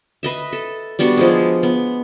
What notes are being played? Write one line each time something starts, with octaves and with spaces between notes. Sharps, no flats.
B4 D#5 E5
A4
G3 B3 D4 F#4
F3 G#3 G#4
B3